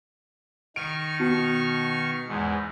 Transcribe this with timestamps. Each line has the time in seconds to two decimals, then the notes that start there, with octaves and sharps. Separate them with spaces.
0.76 D#3 C#6 F6 D7
1.20 B2
2.28 E2 G#2